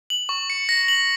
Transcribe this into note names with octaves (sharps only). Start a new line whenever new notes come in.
F#7
C#6
C#7
A#6
F#7